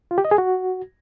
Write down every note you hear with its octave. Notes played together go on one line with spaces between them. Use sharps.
F4
G4
D#5
G#4
F#4